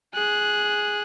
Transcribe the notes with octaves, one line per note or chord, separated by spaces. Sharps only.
G#4 F#6